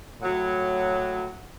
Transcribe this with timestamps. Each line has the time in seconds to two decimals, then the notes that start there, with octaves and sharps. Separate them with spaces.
0.22 A2 F#3